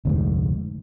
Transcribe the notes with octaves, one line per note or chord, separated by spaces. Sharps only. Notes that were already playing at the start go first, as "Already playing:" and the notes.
F1 D2 G#2